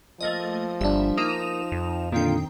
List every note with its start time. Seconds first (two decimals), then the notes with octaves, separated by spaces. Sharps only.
0.21 F3 A3 A#3 D#5
0.81 G1 G3 D4 E5
1.17 A#3 D#4 D#6 E7 F7
1.72 F2
2.12 A#2 D3 D#3 C4 F4 G5